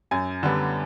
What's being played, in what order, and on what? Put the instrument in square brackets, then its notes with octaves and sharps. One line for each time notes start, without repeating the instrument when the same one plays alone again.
[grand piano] F#2 G#5
D3 G3 B3